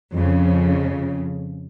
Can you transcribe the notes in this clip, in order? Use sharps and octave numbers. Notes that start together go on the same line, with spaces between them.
F2 C#3